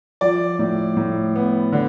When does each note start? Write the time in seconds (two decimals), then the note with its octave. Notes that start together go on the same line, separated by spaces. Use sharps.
0.21 F3 D5
0.59 A2
0.97 A2
1.36 B3
1.72 D3